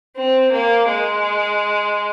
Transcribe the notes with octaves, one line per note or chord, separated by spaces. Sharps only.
C4
A#3
G#3